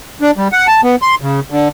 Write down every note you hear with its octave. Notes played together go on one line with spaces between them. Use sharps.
D4
G3
F#5
A5
B3
C6
C#3
D3